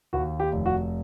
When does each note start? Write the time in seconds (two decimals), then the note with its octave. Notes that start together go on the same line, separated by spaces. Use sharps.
0.13 D#2 F#4
0.40 G4
0.52 F1
0.66 F#4